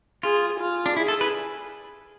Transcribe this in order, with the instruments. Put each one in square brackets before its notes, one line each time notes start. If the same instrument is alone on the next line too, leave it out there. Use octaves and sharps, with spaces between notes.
[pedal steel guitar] F4 [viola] G#4
[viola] F4
[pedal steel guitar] D4
[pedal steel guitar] E4 [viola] G#4
[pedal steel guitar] A4
B4